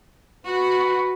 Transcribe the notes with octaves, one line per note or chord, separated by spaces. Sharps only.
F#4 B4